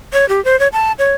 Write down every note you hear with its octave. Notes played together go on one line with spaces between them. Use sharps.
C#5
G4
C5
C#5
A5
C#5